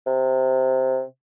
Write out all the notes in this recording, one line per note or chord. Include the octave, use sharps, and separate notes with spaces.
C3